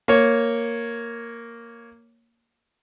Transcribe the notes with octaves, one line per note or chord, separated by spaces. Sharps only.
A#3 C#5